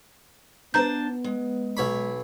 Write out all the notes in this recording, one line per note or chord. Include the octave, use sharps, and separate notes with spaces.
B3 D4 B4 C5 A5 A#5 G6
G#3
B1 C#5 B5